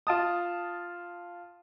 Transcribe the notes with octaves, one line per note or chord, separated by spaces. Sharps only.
F4 A5 D#6